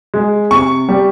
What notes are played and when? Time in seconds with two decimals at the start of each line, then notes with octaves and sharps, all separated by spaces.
0.14 G#3
0.51 C3 C#6
0.89 G3